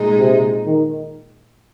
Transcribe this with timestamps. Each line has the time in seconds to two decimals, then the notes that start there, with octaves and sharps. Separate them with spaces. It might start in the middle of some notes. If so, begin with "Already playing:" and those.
Already playing: A#2 G#3 D#4 G#4
0.18 C3
0.66 D#3